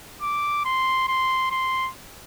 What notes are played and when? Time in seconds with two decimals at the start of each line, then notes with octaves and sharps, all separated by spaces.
0.22 D6
0.65 C6
1.08 C6
1.51 C6